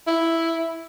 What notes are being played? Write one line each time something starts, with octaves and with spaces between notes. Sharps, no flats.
E4